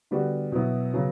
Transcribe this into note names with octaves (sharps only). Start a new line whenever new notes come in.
D3 G3 B3 F#4
B2 F#3 B3 E4
C#3 F#3 B3